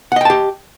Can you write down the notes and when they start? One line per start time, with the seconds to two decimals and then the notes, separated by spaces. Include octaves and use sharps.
0.12 F#5
0.16 D#5
0.21 G5
0.25 A5
0.30 G4